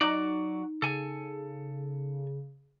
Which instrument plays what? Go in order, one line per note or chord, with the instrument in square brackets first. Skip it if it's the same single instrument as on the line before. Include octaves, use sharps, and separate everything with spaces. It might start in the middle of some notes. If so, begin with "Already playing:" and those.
[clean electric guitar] F#3 F#4 D5 [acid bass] D#4
[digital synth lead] C#3 [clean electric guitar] A4 G#5